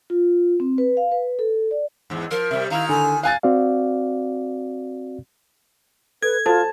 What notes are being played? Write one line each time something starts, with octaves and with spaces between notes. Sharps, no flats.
F4
C4
B4
F5
B4
A4
D5
E2 G#2
F3 A#4
C3 G3 E5
D#3 E4 F5 A#5
D3 G#5
F5 G#5 F#6 A6
C4 F#4 D5 F5
A4 B4 G#6
F4 F#4 A4 C5 A5